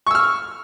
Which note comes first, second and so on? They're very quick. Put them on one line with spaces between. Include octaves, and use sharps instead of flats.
C#6 E6 F6